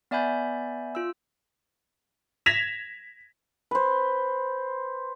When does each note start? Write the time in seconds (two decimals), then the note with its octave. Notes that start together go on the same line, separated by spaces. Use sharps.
0.11 B3 D5 E5 G#5 B5 G6
0.95 F4 E6
2.46 G#6 A#6 B6 E7 F7
3.71 B4 C5